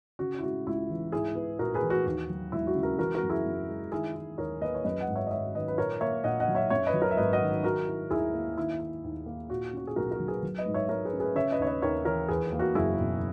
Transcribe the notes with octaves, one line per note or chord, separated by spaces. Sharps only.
C#3 F#4
E4
G#3 F#4
C#2 E4
E3
G#2 E4 G#4
B3
A#1 F#4 A#4
G#4 B4
E3
F#4
D#2 F#4
F#3
E1 E4
F#4
C#3
F#4 A#4
E3 F#4 A#4
F#4 A#4
F#2
E4 G#4
F#2
G#3
D#3 E4 G#4
E4
D#2 A#4 C#5
A#3 B4 D#5
C#5
F#2 B4 D#5
D#5 F#5
G#1
C#5 E5
D#5
G#1 C#5 E5
D#3 B4 D#5
B4
A#2 A#4 C#5
A#3 C#5 E5
A#1 D#5 F#5
D#5 F#5
F#3
C#5 E5
F#2 C#5 E5
B4 D#5
F#3
A#4 C#5
E5
G#1 B4 D#5
D#5 F#5
D#3
D#3 F#4 A#4
E4
D#2 E4 G#4
A#3
D#3 E4
E4
D#2
A#3
A#2 F#4
C#4 F#4
G#4
B1 F#4 A#4
F#4 A#4
F#3
G#4 B4
F#3
B4 D#5
G#2
C#5 E5
G#2 A#4 C#5
G#4 B4
C#4
G#4 B4
C#3 C#5 E5
B4 D#5
D#2 C#5
B4 D#5
D#2 A#4 C#5
E3 A#4 C#5
E2 G#4 B4
A#3
F#4 A#4
F#1 E4 G#4
B2